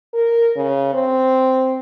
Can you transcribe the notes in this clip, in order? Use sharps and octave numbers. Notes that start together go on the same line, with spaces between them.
A#4
C#3
C4